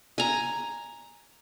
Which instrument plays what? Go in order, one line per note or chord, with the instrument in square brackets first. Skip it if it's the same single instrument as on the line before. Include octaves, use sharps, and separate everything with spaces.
[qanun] G#5 A#5